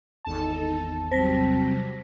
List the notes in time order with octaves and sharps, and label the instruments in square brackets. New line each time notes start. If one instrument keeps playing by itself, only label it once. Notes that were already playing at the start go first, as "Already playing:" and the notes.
[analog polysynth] G#1 E2 A5 [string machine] D#4 A4
[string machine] C3 F#3 G3 [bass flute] C4 [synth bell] C5 A#6 B6